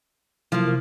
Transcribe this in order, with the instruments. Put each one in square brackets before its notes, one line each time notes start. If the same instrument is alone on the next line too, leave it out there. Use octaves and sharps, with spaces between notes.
[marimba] C3 F#3 E4 [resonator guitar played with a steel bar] F3 A#3
[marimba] C3